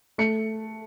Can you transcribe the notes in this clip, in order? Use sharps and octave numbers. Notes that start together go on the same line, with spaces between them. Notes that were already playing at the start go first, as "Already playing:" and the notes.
A3 C#7